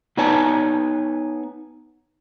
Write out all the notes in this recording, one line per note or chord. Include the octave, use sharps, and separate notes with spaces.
B3 D#4 B4 C#5 G#5 A5